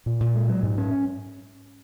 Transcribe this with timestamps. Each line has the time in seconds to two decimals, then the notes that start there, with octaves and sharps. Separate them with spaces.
0.06 A#2
0.20 A#2
0.35 G#3
0.48 F#3
0.63 G#2
0.78 C#4